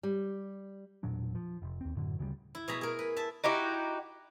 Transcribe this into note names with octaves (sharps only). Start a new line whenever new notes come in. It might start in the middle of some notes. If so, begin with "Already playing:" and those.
G3
E1 A#2 F#3 D4
F3
F1
D#2 C4
F#2 A2 D3 F#3
D2 C#3 F3 G3
E4
B2 G#4 A#5 B5
G#4 A#4
B4
E5 A5
D#4 E4 F#4 G4